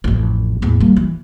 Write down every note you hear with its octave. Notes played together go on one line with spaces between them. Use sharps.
A1 F2
E2 A2
G3 A#3
E3